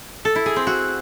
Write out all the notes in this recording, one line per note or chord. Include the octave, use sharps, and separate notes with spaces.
A4
E4
G#4
C4
F#4